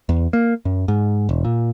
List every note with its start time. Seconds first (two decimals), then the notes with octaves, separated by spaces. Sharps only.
0.09 E2
0.33 A#3
0.65 F#2
0.88 G#2
1.29 E1
1.45 A#2